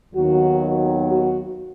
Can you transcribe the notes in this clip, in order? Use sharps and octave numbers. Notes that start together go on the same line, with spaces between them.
D#2 D#3 F#3 B3 F#4
F#4